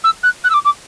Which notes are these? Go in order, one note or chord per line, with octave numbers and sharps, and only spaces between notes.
E6
F#6
F#6
E6
D6
D6